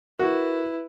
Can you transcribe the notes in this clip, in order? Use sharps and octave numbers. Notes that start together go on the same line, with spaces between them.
E4 F#4 A#4 B4